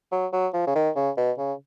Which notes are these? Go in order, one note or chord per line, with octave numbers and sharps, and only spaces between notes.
F#3
F#3
F3
C#3
D#3
C#3
B2
C#3